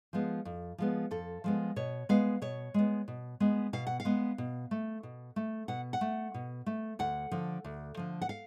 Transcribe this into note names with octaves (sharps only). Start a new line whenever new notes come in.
F3 G#3 B3
F2
F3 G#3 B3
F2 A4
F3 G#3 B3
B2 C#5
G#3 B3 F5
B2 C#5
G#3 B3
B2
G#3 B3
B2 F5
F#5
F5
G#3 B3
B2
A3
B2
A3
B2 F#5
F#5
A3
B2
A3
D2 F#5
D3 F3
D2
D3 F3
F#5
F5